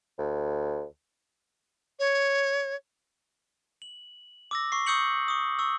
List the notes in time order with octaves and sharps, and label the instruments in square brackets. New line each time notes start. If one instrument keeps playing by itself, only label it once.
[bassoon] D2
[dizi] C#5
[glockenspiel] F#7
D6 E6 A#6
C#6 C7
C#6 D#6 E6 G6 C#7 F#7
C#6 D#6
C#6 E6